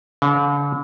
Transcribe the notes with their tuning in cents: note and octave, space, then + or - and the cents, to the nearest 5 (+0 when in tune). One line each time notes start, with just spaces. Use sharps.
D3 -45